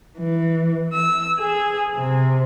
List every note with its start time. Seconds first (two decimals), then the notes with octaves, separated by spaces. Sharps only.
0.19 E3
0.93 E6
1.38 G#4
1.96 C3